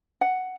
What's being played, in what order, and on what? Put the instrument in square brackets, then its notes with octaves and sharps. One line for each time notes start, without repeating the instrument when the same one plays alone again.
[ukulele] F#5